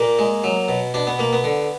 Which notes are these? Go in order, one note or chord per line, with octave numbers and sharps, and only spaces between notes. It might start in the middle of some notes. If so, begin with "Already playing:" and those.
Already playing: A#2 A#3
G#3
F#3
B2
B2 D4
B3
B2 A#3
B3
D3